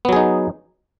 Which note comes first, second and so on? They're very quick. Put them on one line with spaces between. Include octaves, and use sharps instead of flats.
B3 F#3 G#4 D#4